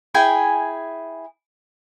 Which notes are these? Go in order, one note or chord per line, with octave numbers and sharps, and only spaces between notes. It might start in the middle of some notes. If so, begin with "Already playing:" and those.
E4 G#4 G5 G#5